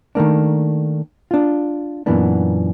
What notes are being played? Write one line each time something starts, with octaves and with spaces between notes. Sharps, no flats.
D#3 A3 A#3 D4
D4 F4
F#2 A#2 E3 A#3 B3 D4